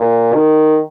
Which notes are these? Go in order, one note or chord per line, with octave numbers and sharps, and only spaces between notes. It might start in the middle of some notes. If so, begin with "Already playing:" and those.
Already playing: A#2
D#3